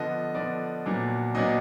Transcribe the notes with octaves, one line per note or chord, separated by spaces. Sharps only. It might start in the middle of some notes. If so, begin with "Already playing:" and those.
Already playing: D3 F3 B3 D#5
D3 F3 B3 D5
A#2 F#3 B3 D4
A#2 F#3 B3 D4 D#5